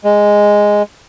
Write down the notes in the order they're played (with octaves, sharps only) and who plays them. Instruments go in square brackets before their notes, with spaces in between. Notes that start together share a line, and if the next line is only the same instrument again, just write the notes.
[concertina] G#3